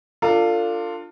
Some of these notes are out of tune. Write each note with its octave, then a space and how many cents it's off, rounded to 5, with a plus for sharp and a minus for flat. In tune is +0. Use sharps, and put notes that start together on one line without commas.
D4 +0 F4 +0 A4 +35